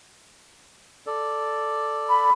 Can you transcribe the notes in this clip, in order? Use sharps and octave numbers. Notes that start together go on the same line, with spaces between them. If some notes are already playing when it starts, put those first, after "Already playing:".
A4 D5
B5